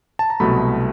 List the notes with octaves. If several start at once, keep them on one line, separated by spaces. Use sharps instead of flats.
A5
A#5
C2 B2 F#3 A3 B5